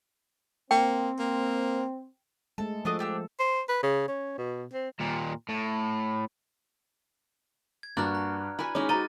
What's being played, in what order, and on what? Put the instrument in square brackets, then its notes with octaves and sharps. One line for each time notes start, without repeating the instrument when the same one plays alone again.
[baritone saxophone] A#3 [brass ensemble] C4 [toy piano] G5
[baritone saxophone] A#3
[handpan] G#3 A3 [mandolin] A4
[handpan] F3 A4 [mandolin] D4 F#4 D#5
[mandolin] D4 G4 E6
[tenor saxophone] C5
B4
C#3
C#4
B2
C4
[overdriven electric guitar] D#2 A#2
A2
[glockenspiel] G#6
[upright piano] G2 [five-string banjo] A#3 [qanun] D4 F#4 [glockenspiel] A#5 F6 F#6
[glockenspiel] A#5
[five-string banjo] E4 F#4 [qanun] B4 G#5
[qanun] G#3 D#4 [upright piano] C#4 [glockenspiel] D6 F6
[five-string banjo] C#4 C5 A#5 [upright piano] F#4 D#7 [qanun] D#5 [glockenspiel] G#5 A6